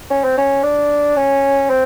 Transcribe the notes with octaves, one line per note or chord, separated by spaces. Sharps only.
C#4
C4
C#4
D4
C#4
C4